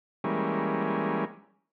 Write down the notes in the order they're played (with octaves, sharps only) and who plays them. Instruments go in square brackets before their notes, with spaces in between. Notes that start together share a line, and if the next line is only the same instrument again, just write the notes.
[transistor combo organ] E3 G3 G#3 A#3 C#4